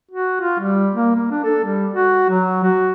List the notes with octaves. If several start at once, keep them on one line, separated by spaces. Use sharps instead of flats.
F#4
F4
G3
A#3
A#3
D4
A4
G3
F#4
F#3
F#4